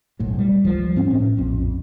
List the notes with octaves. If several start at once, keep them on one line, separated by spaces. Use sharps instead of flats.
F#1 B1 A2
G3
C#2 F3
G#2 C4 C#4
A2 C#4
A#1 F2